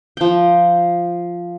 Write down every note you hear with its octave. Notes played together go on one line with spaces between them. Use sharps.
F3 G5